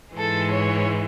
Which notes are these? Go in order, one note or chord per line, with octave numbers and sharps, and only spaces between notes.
G#2 E3 G#3 A4
C#5